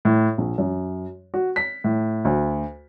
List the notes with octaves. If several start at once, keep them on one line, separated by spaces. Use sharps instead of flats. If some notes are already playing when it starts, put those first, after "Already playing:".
A2
A#1
F#2
F#4
B6
A2
D2